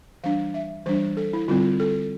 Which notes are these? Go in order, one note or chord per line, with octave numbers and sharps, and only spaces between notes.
E3 G3 D4 F5
E5
E3 G3 D4 C5
A4
E4
D3 G3 C4 F4
A4